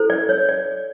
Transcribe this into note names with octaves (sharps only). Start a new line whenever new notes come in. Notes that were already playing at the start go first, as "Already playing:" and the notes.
Already playing: E4 A4 C5
D5
C#5
D5